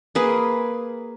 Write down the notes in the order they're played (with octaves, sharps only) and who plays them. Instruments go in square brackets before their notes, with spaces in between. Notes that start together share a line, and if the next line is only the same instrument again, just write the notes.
[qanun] A#3 G#4 B4